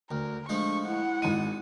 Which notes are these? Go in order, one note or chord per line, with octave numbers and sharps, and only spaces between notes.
D2 A#4
F3 G#3 A3 D4 C#6
E4 F#5
G#1 G#3 D#7